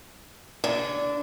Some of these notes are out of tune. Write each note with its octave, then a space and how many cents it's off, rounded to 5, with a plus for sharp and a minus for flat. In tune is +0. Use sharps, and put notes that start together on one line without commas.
D3 -15